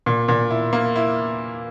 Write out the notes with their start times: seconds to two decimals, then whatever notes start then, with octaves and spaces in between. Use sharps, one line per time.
0.06 A#2
0.28 A#2
0.50 E4
0.73 A#3
0.96 E4